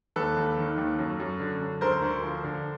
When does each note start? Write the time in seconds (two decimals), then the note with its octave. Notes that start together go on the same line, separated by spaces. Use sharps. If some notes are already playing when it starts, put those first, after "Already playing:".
0.16 D#2 A4 B4
0.37 D#2
0.58 D#3
0.78 D#2
0.99 F#2
1.20 F#2
1.40 D3
1.61 F#2
1.81 D2 A#4 C5
2.02 D2
2.23 F3
2.44 D3